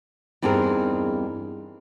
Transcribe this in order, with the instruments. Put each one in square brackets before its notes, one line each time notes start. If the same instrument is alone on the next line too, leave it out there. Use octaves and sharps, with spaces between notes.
[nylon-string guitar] E2 G2 C4 D#4 G#4 A#4